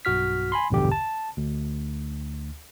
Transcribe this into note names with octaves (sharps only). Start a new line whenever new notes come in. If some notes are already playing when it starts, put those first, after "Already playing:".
B1 G2 F#4 F6 B6
G#5 B5 C6
A#1 E2 G2 B2 D3 G4
A5
D2